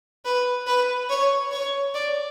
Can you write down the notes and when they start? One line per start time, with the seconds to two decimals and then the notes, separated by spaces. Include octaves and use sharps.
0.25 B4
0.67 B4
1.09 C#5
1.51 C#5
1.94 D5